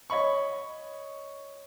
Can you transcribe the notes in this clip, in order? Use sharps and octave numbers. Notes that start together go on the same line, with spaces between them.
C#5 D#5 B5 C#6